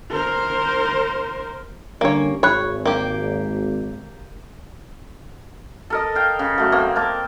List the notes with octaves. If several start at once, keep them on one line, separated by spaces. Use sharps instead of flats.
A#4 C5
D3 G3 A#3 C#4 C#5
G#1 C#5 B5 F#6
A#3 G4
A4 A#4 D#5
F5 G5
C#3
F#3 A3
A#3 C4
A#4 G5 A5 D6